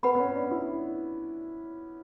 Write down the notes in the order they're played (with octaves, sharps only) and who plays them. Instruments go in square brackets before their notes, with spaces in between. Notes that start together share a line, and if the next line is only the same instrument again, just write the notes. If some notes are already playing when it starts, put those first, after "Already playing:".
[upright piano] B3 [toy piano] B4 F#5 B5
[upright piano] B3
C#4
D4
E4